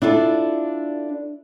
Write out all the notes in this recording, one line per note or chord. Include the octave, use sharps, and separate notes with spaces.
D4 E4 F4 A4